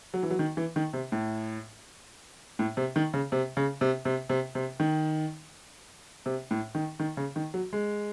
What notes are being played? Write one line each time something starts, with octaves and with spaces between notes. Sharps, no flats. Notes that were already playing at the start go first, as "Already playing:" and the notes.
F#3
E3
F#3
D#3
E3
D#3
C3
A2
A2
C3
D#3
C#3
C3
C#3
C3
C3
C3
C3
D#3
C3
A2
D#3
D#3
C#3
D#3
F#3
G#3